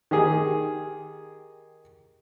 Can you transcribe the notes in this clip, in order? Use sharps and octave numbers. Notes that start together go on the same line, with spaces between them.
D#3 G4 G#4